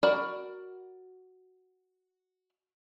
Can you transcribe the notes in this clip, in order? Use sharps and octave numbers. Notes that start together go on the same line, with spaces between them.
F#4 A#4 D5 B5